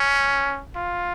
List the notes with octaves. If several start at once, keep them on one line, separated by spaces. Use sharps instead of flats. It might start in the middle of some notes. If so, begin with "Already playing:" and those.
Already playing: C#4
F4